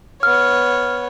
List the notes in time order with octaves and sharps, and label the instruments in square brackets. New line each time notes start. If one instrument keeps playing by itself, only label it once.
[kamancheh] B3 C#5 [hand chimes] F6